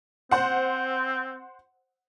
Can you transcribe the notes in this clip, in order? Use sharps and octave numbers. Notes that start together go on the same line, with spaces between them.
C4 C5 F#5